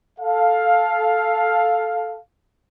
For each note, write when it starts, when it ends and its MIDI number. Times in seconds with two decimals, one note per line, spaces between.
0.20 2.17 69
0.20 2.17 77